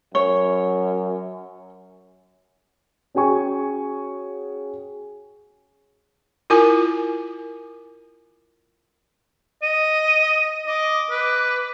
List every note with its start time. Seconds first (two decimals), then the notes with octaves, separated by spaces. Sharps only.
0.15 F#2 C#5
3.15 C#4 F#4 G#4 G5 G#5 C#6
6.50 E4 F4 A#4 G#5 D6
9.62 D#5 D#7
10.67 D#5 D6
11.11 B4